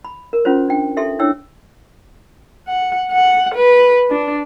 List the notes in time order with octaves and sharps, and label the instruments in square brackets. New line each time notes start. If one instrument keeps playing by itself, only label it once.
[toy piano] B5
A#4
C#4 F4 F#4 C5
D4 G5
D#4 G4 A4 E5 C6
D4 E4 C#5 G5 E6
[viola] F#5
F#5
B4
D4